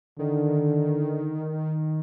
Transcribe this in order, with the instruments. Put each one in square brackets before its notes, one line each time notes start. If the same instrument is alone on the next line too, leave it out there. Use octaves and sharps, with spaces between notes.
[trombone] D3 [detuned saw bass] D#3